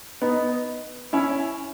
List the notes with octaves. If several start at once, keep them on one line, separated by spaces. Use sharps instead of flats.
B3 D#4
C#4 E4